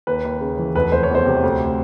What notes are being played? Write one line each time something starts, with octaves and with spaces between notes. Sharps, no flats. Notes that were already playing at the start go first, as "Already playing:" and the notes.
D#2 B4
D#2
C#3
E3
F1 B4
F1 C5
C#5
E2
C5
C3
D2